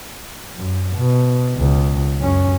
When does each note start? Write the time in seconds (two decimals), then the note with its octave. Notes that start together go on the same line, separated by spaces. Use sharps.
0.57 F#2
0.97 B2
1.56 C#2
2.18 F#2 C#4